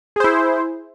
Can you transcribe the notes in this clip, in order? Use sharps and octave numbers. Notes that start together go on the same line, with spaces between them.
E4 G#4 C5